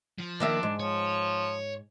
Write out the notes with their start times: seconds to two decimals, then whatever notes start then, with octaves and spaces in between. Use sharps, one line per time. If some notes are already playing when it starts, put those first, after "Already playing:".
0.19 F3
0.40 D#3 A#3 D4 E5
0.63 G#2
0.80 F3 C#5